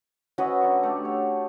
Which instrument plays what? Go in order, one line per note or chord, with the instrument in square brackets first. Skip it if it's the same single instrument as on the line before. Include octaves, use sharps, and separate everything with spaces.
[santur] C#4 F#4 [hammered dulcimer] B4 D#5 E5
[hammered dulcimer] D3 F#3 C#6
A3 G4
C#5